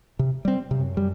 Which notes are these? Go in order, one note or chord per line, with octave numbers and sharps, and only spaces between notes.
C3
G3 C4
F#2 C3
G3